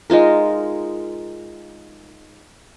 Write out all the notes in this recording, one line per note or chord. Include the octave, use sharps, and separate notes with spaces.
G#3 D#4 F4 A#4